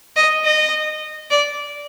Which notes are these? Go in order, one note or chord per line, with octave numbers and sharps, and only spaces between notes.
D#5
D#5
D5